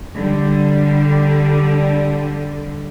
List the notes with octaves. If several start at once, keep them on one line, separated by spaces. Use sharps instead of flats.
D3 G3